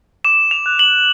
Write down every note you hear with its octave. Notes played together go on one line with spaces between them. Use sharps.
D6 E7
F7
F#6
F#7